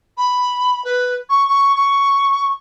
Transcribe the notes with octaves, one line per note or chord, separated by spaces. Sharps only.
B5
B4
C#6
C#6
C#6